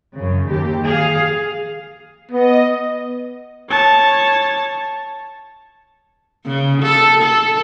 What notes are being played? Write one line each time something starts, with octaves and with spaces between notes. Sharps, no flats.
F#2 C#3
D#2 G4
G#4 F5
B3 D#5
C#5 A5
C#3
A4
A4